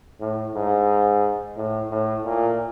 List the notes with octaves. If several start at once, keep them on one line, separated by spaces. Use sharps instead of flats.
A2
G#2
A2
A2
A#2